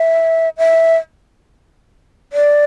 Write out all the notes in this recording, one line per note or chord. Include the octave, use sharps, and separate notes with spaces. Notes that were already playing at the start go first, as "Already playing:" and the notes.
Already playing: E5
E5
D5